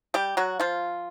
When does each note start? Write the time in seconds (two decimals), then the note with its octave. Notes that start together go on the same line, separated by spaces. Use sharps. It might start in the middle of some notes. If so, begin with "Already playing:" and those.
0.14 G3 G4
0.37 F#3 F#4
0.60 F3 F4